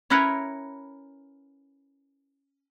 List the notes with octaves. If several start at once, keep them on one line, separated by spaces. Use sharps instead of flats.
C#4 E4 A#4 B4 C#5